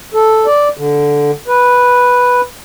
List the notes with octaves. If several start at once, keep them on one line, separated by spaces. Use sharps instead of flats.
A4
D5
D3
B4